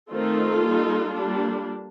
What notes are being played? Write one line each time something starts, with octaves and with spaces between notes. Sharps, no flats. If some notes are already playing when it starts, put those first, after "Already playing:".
D#3 A3 C4 D#4 F4 A4
G3 A#3 D#4
G3 A#3 D4